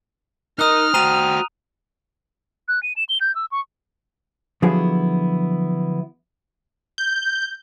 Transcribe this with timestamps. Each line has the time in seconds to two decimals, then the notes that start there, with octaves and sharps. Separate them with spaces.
0.59 D#4 A#4 D#5 D#6 F6 F#6
0.94 F#4 C5 G5 A#5 D#7 F7
2.68 F#6
2.83 D#7
2.96 E7
3.09 G7
3.21 G6
3.35 E6
3.52 C#6
4.62 D3 F3 F#3 B3 E4 G#4
6.98 G6